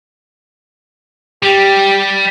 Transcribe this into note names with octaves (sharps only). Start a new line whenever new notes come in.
G3 G4